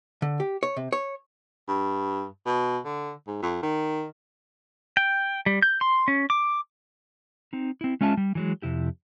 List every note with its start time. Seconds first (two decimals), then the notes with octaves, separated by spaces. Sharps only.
0.22 D3
0.40 G4
0.63 C#5
0.77 C3
0.93 C#5
1.68 G2
2.46 B2
2.85 D3
3.27 G#2
3.42 F2
3.63 D#3
4.97 G5
5.46 G3
5.62 G6
5.81 C6
6.08 C#4
6.30 D6
7.53 C4 D#4
7.81 C4 E4
8.01 G#3 C#4 F4 E5 A5
8.17 G3
8.35 E3 F#3 G#3
8.62 F2 C3 E4 G4